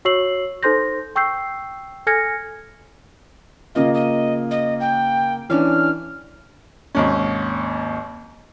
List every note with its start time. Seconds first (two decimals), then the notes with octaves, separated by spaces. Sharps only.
0.05 F#4 C#5 C#6 E6 C7 F#7
0.63 D#4 A4 C5 C6 G6 A#6
1.16 G5 C#6 E6 G6 C7
2.07 A4 G#5 F6 G#6 A#6 C#7
3.75 C#3 A#3 F4 D#5
3.94 D#5
4.51 D#5
4.80 G5
5.49 E3 C#4 D4 F6
6.95 G#1 D#2 C#4